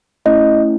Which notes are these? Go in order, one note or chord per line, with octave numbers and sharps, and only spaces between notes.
A3 C#4 E4 D#5